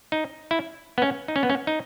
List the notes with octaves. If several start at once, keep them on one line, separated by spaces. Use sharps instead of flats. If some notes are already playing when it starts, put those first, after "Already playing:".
D#4
E4
B3
C#4
D#4
C#4
B3
C#4
D#4